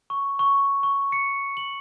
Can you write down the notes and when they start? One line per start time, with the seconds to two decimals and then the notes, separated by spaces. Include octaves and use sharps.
0.10 C#6
0.39 C#6
0.83 C#6
1.12 C#7
1.57 F#7